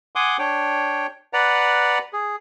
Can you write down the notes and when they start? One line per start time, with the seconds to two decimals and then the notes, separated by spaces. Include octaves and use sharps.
0.16 F#5 G#5 C6 D6 D#6
0.39 D4 C#5 G5
1.33 B4 D5 F#5 A#5
2.13 G#4